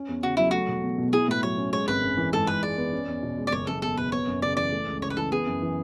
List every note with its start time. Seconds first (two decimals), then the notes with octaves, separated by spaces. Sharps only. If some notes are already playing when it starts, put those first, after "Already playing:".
Already playing: C#4
0.09 E2
0.23 C#3 F#4
0.37 F#3 E4
0.51 A3 F#4
0.68 E1
0.83 E2
0.98 B2
1.13 E4 G#4
1.28 A2 B4
1.43 F#3 C#5
1.58 C#4
1.73 G#3 C#5
1.88 G#1 B4
2.03 F#2
2.18 E3
2.33 G#2 A4
2.47 G#2 B4
2.63 G#3 D5
2.78 B3
2.93 C#4
3.08 E2
3.23 B2
3.37 G#3
3.47 D5
3.52 F#1 C#5
3.67 F#1 A4
3.82 E2 A4
3.97 B2 B4
4.12 B3 C#5
4.27 F#2
4.42 C#3 D5
4.57 E3 D5
4.72 A3
4.87 C#2
5.02 C#3 C#5
5.10 B4
5.17 E3 A4
5.32 B3 G#4
5.47 F#2
5.62 E3